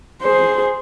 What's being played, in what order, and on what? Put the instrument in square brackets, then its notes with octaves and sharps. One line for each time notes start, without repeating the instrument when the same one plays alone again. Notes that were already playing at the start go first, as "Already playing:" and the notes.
[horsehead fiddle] G#4 C5